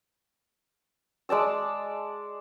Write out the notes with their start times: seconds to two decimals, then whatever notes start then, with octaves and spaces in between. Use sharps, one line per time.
1.29 G#3 D5 A5 E6